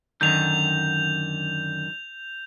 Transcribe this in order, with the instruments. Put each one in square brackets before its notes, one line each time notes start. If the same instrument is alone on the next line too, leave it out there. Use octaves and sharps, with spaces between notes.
[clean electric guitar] F#2 D3 D#3 [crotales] G6 F7